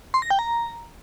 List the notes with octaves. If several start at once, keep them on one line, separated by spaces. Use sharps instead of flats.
C6
A#6
G5
A#5